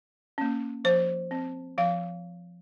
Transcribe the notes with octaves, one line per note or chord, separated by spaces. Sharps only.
A#3 C#4
F3 C5
C4
F3 F5